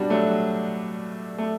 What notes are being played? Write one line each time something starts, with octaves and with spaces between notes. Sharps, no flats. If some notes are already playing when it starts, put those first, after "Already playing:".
Already playing: B2 G3 D4 F#4
F#3 A3
F#3
A3